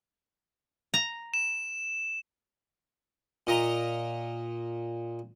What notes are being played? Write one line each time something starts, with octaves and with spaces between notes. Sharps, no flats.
A#5
E7
A#2 D#5 A#5